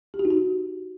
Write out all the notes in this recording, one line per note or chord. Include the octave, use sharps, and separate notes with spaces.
G4
F#4
D#4
F#4